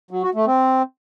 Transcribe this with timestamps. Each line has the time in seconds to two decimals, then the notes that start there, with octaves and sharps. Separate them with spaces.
0.11 F#3
0.23 F#4
0.35 A3
0.47 C4